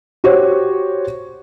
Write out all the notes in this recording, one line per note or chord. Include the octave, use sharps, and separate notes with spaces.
F#4 G4 C5 C#5